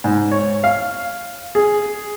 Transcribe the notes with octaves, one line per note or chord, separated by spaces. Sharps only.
G#2
C#5
F5
G#4